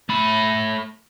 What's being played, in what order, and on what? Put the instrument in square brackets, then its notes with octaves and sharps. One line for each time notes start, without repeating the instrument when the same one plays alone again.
[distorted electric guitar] A3 B5